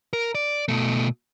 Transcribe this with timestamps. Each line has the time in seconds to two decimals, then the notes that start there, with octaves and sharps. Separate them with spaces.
0.13 A#4
0.35 D5
0.68 B2 A3